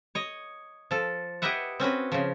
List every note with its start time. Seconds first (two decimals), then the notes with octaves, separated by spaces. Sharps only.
0.15 C#5 D#5
0.91 F3 A4
1.42 E4 G4 B4 D#5 E5 F#5
1.80 C4 C#4 F#4 B4
2.12 C#3 F3